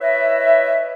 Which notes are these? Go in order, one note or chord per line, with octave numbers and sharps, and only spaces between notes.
E4 B4 C#5 D#5 E5